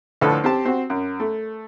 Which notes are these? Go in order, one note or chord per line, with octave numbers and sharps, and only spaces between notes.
D2 A2 F3 A4 B4
C4 G4 A5
C4 F#4
F#2
A3